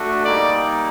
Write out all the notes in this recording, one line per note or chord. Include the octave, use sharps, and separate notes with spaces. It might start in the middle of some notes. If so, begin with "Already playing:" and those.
Already playing: A3 D4 F#4
G3 A#3 D#4 D5